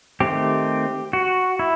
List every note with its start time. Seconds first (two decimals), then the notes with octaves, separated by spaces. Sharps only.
0.20 D#3 A3 C4 G4
1.13 F#4
1.59 E4